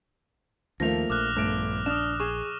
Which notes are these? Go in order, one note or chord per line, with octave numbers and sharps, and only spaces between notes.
D#2 F3 A3 A#3 A#6 F7
A#1 D6 F6 F#6
G1 A3 D7
D4 D#6 F6 E7
G#4 C#6 E7